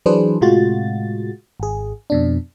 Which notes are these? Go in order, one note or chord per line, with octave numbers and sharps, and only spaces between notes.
E3 F#3 D4 G#4 B4 C5
A2 C3 G#3 F4 F#4 A6
G#1 G#4
F2 B2 D4